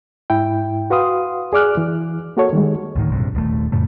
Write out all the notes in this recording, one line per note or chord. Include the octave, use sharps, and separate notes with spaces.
G#2 E4 G5
F#4 B4 F5 C6 D#6
G#4 D5 D6 F6 F#6
E3
A#3 F#4 A4 C#5
D#3 G3 G#3
D2 A2 D#3
A#1 G2 C3
D#1 D#2 A3
F2 A2 C#3 A3